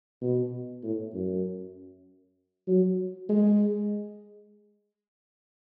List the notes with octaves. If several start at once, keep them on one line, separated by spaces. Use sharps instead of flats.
B2
A2
F#2
F#3
G#3